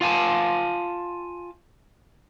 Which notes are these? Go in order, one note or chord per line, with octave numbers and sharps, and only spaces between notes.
F4 F5 G#5 A5